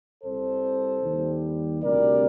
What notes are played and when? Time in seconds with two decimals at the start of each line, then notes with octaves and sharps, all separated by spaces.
0.24 C2 C3 G3 A4 C5
1.03 D#2 D#3 G3
1.82 D2 C3 G3 A#4 D5